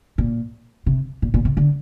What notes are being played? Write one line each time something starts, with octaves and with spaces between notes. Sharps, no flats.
A#2
C3
A#2
A#2
C3
D3